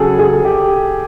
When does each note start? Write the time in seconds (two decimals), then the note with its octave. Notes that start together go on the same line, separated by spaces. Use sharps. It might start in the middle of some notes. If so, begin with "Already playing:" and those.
Already playing: C#3 F#3 G#4 A4
0.19 G#4
0.45 G4